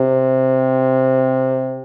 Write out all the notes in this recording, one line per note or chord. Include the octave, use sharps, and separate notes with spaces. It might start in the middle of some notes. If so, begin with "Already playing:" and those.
Already playing: C3